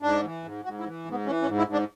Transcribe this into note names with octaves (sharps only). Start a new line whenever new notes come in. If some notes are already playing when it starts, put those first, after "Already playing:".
G#2 D4
E3
G#2
G#2 F#4
E4
E3
G#2
B3
E3 C#4
C#4
G#2
E4
G#2
D4